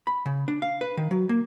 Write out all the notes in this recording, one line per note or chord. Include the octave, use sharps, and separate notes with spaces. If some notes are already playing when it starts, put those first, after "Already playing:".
B5
C#3
D4
F5
B4
D#3
F#3
A#3